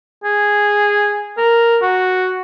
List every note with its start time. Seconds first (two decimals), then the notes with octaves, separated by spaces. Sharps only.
0.24 G#4
1.37 A#4
1.82 F#4